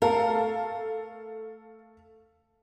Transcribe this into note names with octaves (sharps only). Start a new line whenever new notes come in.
A3 A4 A#4 F5